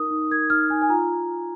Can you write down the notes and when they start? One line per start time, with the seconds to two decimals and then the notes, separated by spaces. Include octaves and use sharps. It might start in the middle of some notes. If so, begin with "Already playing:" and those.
Already playing: D#4 A#4 D#6
0.11 D#4
0.31 A#4 G#6
0.50 D#4 F6
0.70 D#4 G#5
0.82 G#5
0.89 F4 A#5